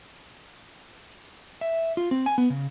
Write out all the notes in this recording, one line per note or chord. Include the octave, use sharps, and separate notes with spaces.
E5
F4
C4
G#5
B3
C#3